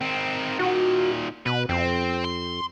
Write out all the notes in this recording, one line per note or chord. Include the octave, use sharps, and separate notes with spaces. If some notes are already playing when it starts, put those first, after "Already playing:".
D#3 C4
A#2 D#3 F#4
B2 B4
F2 C4
C6